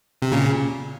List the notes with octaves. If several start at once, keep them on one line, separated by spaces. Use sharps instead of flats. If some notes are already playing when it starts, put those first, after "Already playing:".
C3
A#2 C#3